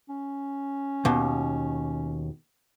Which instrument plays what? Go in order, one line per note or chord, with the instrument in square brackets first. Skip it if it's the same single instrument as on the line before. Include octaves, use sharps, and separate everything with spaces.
[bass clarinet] C#4
[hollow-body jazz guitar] D#2 B2